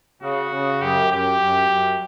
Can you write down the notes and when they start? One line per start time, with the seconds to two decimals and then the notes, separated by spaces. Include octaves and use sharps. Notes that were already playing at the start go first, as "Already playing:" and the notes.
0.22 C#3 F#4
0.52 C#3
0.81 F#2 G4
1.11 F#2 G4
1.41 F#2
1.70 F#2